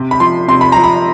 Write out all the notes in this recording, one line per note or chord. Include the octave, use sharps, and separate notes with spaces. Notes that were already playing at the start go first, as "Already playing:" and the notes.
Already playing: C3
B5
F3 C6
C3 C6
B5
F3 A#5
B5